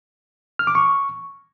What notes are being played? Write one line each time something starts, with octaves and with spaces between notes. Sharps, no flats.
F6
D6
C#6